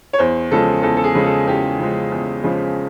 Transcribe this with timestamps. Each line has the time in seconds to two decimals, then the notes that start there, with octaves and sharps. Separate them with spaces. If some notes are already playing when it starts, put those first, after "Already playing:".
0.13 C#5
0.18 E2 C5
0.51 C#3 F3 G#3 A4
0.82 E2 A4
0.97 A4
1.04 G#4
1.15 C#3 F3 G#3
1.26 A4
1.47 E2 G4
1.79 C#3 F3 G#3
2.11 E2
2.43 C#3 F3 G#3